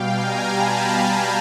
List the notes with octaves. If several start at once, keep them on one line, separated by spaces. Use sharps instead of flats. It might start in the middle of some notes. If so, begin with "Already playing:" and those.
Already playing: B2 G3 F5 G5
G#5 A#5
A5 B5